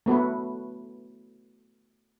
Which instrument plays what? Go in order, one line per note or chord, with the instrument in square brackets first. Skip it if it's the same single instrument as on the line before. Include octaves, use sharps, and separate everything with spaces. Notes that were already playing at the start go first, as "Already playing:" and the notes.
[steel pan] A3 B3 F#4 B4